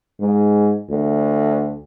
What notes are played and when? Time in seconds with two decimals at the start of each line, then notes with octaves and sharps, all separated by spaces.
0.20 G#2
0.90 D2